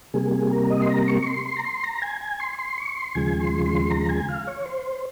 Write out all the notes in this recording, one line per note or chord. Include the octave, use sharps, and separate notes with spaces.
C3 G3 A#3 G#4
G#4
A#4
D#5
C6
A#5
C#6
C#6
C6
C6
A#5
C6
A#5
G#5
G#5
C6
C6
C#6
C6
D#2 C#3 F3 G#3 G#5
C6
C6
A#5
G#5
F5
C#5
C5